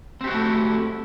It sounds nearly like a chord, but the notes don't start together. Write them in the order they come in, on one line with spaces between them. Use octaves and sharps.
C4 G4 F#4 E4 A3